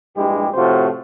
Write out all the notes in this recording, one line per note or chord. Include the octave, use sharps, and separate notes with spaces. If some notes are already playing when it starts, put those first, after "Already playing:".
A#1 G2 G#3 E4 G4
A2 C3 F3 F4 F#4 C5